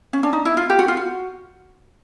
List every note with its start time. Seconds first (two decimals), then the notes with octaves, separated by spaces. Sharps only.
0.13 C#4
0.23 D4
0.33 D#4
0.45 E4
0.57 F4
0.70 G4
0.79 F#4
0.88 F4
0.97 F#4